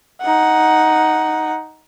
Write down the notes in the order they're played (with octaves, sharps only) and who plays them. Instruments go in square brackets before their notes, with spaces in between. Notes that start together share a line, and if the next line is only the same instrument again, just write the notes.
[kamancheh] D#4 F#5